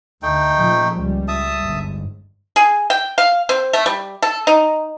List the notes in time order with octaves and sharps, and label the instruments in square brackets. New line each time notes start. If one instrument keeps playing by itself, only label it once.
[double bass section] D2 [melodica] A3 D#4 G5
[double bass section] A#2 C#3 F3
C#2 G3
[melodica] E5 A5 D#6
[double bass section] G1 G#2
[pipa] G#4
G5
F5
C4
A3
G3
A4
D#4